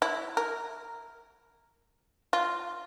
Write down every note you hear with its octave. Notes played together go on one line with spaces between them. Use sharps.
E4
A#4
F4